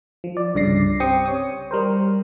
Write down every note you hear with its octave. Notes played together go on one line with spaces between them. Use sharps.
F3
D5
C2 G2 C#3 D5 A#6 C7
C4 G4 G5 D#6 C#7
C#5 D#6
G3 A#4 C5